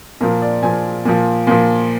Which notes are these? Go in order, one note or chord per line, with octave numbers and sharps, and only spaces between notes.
A#2 F3 A#4
D5
A#2 F3 G#5
A#2 F3
A#2 F3